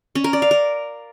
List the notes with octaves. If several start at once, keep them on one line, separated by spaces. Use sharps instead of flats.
C#4
A#4
D5
F5
A#4